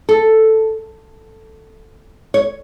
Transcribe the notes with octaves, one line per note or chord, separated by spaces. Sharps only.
A4
C#5